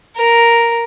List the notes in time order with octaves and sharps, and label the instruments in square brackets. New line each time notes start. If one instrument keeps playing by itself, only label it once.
[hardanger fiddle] A#4